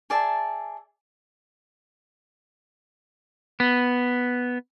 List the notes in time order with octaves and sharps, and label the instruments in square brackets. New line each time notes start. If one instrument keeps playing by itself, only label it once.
[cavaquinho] G#4 D5 E5 A5
[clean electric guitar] B3